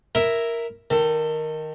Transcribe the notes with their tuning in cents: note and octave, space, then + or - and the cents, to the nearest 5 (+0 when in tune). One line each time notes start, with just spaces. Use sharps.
E4 +0 A#4 +0 E5 +0
D#3 +0 A4 +25